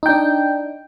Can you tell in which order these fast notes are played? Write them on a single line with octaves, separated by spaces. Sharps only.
D#4 G5 D4